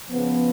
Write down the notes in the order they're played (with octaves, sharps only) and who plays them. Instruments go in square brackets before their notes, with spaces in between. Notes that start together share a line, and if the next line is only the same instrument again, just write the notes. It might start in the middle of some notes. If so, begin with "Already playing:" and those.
[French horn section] C#3 F3 B3